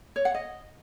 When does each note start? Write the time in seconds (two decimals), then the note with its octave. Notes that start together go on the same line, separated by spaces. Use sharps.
0.16 C#5
0.25 F#5
0.34 D#5